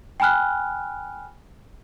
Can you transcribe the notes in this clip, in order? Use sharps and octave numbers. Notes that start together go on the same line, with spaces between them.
G5 G#5 B5 F6 F#6